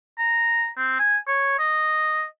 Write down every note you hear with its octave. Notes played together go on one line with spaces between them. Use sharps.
A#5
C4
G#5
C#5
D#5